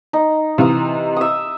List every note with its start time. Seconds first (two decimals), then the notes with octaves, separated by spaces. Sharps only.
0.13 D#4
0.58 C3 E3 F5 D#6
1.16 E5 D#6